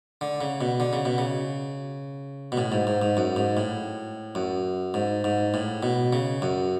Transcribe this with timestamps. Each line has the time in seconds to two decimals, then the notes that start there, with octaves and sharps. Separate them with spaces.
0.21 D3
0.41 C#3
0.61 B2
0.80 D3
0.93 C#3
1.05 B2
1.18 C#3
2.52 B2
2.57 A2
2.72 G#2
2.87 G#2
3.02 G#2
3.17 F#2
3.36 G#2
3.57 A2
4.35 F#2
4.94 G#2
5.24 G#2
5.54 A2
5.83 B2
6.13 C#3
6.42 F#2